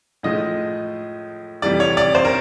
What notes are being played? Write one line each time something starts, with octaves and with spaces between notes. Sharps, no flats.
A2 F3 G#3 D#5
F2 C3 E3 G3 D5
C#5
D5
C5
A#4